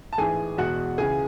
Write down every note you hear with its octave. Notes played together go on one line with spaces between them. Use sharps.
A5
A1 G#2 E3 G#4 G#5
E2 B2 G#3 F#4 F#5
C#2 C#3 E3 G#4 G#5